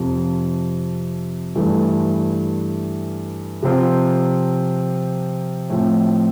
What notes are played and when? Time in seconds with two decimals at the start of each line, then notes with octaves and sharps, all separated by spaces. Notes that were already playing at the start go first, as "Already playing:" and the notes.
Already playing: F2 C3 F3
1.56 G2 E3 A3
3.62 C3 F3 C4 F4
5.70 A2 F3 C4